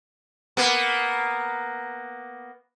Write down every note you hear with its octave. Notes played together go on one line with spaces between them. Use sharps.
A#3 B3